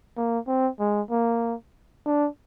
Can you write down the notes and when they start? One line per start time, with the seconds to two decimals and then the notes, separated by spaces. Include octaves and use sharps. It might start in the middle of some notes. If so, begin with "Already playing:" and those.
0.17 A#3
0.47 C4
0.79 G#3
1.11 A#3
2.06 D4